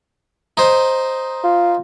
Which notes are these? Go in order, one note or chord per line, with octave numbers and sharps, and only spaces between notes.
D#4 C5
F4